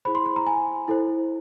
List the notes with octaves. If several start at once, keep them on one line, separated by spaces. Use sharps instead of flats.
E4 G#4 C5 B5
C6
B5
A#5
G#5
E4 A4 C5